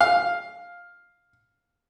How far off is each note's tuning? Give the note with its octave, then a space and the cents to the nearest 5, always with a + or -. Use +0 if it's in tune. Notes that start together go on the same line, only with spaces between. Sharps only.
F5 +5